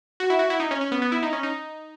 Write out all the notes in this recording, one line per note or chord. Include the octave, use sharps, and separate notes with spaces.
F#4
E4
F#4
E4
D#4
C#4
C#4
B3
B3
E4
D#4
C#4
D#4